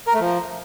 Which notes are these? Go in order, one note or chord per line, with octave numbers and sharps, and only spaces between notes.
A#4
A3
F3